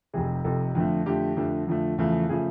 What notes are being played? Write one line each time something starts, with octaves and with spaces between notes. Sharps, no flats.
F1 F2 C3 G#4
F1 F2 C3 A4
F2 D3 F3 A3
F2 D3 F3 A3 G4
F2 D3 F3 A3
F2 D3 F3 A3
E2 C#3 F3 A3
C#3 F3 A3 G#4